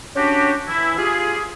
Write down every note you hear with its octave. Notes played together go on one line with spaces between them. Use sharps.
C#4 D4 F#4 G4
E3 E4
F4 G4 G#4